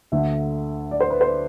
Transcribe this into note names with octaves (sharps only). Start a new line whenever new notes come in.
D2 D3 E5
D5
C5
B4
C5